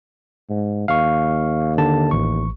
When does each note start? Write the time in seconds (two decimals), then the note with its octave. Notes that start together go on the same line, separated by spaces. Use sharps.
0.50 G#2
0.88 D#2 F5 C#6
1.78 D3 A5
2.11 A1 C#6